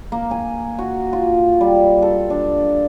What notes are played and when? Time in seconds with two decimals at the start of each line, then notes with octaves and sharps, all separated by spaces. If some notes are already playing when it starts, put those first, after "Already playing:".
0.12 A#3
0.31 G#5
0.79 F#4
1.13 F4
1.61 G3
2.02 A4
2.30 D4